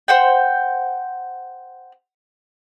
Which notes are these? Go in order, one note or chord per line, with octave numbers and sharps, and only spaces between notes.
C5 F#5 G5